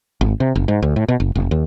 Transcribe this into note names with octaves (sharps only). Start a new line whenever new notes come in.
G#1
C3
F#1
G#2
D2
A2
B2
F#1
F1
D#2